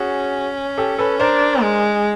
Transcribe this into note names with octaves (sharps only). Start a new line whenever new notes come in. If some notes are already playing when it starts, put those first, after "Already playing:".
Already playing: C#4 F#4 G#4
G4 A4
A4 B4
D4 A#4 C5
G#3